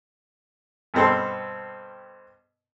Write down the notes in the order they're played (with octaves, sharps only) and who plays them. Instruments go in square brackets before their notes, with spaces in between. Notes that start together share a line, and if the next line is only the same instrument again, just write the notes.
[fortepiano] G2 B2 C4 A4 C6